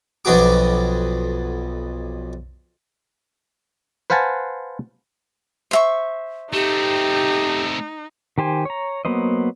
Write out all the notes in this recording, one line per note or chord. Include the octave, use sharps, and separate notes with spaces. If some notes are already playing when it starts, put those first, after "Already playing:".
B1 F2 B3 D4 F#4 D6
B4 C5 F5 F#5 G#5 A5
C5 E5 C#6
A3 C4 D#4 G4
D#3 G4 C5 G#5
C#5 A#5
F#3 A#3 B3 C5 D#5